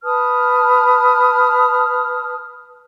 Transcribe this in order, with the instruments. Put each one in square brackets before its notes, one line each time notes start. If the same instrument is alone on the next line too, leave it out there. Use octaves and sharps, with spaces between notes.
[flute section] B4 A5 D#6 F6